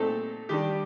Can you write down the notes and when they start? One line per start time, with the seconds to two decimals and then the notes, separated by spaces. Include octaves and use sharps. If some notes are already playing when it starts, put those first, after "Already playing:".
Already playing: A#2 A3 C4 D#4 A4
0.49 D#3 G3 D4 G4